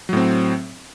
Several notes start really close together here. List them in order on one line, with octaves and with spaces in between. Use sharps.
F#3 A2 C4